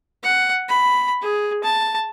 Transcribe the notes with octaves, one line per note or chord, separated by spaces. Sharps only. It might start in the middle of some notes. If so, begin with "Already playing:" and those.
F#5
B5
G#4
A5